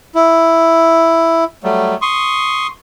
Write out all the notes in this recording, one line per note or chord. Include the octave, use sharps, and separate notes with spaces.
E4
F#3 G3 A3
C6 C#6 D#6